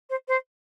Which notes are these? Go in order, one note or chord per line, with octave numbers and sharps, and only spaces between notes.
C5
C5